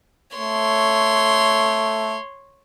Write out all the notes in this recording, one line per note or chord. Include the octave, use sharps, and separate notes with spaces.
A3 C#5 C6